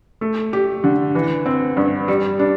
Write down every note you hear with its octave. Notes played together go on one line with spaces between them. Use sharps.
A3
G4
D3
E3
C4
G2
G3
D4